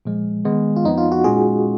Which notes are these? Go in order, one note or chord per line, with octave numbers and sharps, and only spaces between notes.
A#2 F3 G#3
D#3 G#3 B3
F4
F2 F3 B3 D#4
F4
F#4
A#2 G#3 C#4 F4 G#4